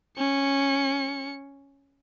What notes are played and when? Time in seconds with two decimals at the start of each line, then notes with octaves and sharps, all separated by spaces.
0.17 C#4 C#7